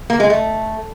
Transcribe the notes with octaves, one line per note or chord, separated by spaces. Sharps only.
A#3
G#3
A3